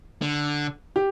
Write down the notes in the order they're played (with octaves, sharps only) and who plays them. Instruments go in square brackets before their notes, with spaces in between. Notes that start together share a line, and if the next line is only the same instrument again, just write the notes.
[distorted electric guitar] D3
[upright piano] G4